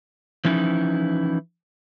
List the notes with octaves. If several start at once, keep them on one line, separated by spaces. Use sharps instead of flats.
E3 F3 C#4 D#4 E4